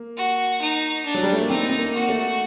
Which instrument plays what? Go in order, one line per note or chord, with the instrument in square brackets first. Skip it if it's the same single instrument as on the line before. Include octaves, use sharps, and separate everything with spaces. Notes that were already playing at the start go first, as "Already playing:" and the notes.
Already playing: [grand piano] A#3
[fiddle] F#4
D#4
D4
[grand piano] F#3
G3
A3
A#3
[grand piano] C4 [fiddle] D#4
[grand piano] C4
A#3
[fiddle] F#4
[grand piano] A3